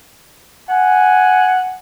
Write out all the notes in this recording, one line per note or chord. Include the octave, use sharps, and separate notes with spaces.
F#5 G#5